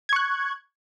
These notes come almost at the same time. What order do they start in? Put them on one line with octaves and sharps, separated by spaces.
G#6 C#6 F#6